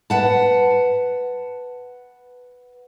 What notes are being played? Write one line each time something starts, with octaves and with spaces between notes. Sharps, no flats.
B4 F#5 A5